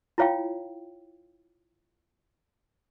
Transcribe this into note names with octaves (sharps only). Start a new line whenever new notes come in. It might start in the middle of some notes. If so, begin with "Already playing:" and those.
E4 F4 C#5 F5 G5